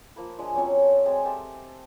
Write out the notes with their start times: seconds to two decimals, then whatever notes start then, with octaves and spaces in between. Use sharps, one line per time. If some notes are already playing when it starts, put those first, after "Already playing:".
0.16 F3 A#3 B5
0.38 F3 G#3 D4
0.55 F#3 C4 C#4 C#5
0.84 A3 D5 D#5
1.06 G#3 C4 G#4 D5
1.25 G4 A4 D#5 E5